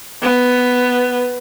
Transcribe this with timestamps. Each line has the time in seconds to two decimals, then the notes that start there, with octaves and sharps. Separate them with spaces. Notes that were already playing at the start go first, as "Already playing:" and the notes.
0.23 B3